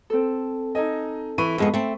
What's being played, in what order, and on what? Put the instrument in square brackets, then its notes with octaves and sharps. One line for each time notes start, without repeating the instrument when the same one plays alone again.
[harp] C4 A4
[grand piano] D#4 D#5 [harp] A4 G#5
[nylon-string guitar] E3 [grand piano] B5 C#6 D#7
[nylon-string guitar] F2 G#3 B3
A3 C4